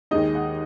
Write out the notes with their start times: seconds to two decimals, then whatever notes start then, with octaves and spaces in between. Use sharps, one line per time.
0.11 D#2 D#3 G#3 D#4 D#5
0.35 F#5